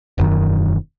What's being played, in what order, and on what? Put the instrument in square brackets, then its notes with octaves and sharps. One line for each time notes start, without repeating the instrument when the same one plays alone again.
[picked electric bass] E1 F#2 D#3